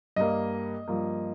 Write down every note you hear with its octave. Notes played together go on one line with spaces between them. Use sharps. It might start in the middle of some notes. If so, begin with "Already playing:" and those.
G2 G3 A#3 D#5
G2 F3 A#3